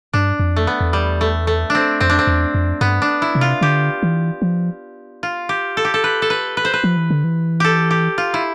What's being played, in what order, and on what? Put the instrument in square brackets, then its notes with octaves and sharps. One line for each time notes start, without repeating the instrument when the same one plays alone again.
[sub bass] G2 [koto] D4
[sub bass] F2
[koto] A3
B3
[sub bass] E2
[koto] G3
A3
A3
D4
C4
[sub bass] F2 [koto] C4
[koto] D4
C4
[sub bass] E2
F2
[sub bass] G2 [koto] B3
[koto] D4
E4
[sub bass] C3
[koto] F4
[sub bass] D3 [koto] G4
[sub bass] E3
F3
[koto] F4
G4
A4
G4
A4
B4
A4
B4
B4
C5
B4
[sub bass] F3
E3
D3
E3
[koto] G4 A4
G4
F4
E4